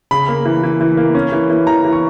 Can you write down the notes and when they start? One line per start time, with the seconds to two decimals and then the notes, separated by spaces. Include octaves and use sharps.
0.11 C#3 B5
0.28 A#3
0.45 E3
0.64 E3
0.81 E3
0.97 A#3
1.15 C#4
1.32 E3
1.50 E3
1.67 E3 A#5
1.85 E3
1.93 C#6